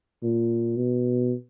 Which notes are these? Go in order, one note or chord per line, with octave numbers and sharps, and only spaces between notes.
A#2
B2